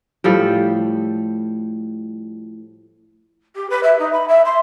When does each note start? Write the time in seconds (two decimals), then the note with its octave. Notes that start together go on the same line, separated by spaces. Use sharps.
0.24 A2 F3 G3 A4
3.56 G4
3.70 B4
3.83 E5
3.99 D#4
4.13 B5
4.28 E5
4.45 C6